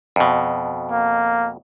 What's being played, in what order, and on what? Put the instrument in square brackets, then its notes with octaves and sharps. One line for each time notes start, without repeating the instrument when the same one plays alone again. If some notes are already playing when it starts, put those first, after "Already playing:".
[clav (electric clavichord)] F2 B2
[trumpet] A#3